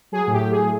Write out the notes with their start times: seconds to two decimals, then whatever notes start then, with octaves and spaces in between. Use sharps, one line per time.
0.12 F#3 G#4
0.27 A2
0.33 G4
0.43 F#3
0.52 G#4
0.58 A2